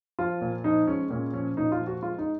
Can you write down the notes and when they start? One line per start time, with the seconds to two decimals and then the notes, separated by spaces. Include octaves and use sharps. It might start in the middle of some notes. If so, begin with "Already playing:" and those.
0.19 F3 F4
0.41 A#2
0.64 F3 D#4
0.87 G#3 C#4
1.10 A#2 C#4
1.33 F3 C#4
1.57 A#2 D#4
1.72 F4
1.79 F3
1.87 F#4
2.03 G#3 F4
2.18 D#4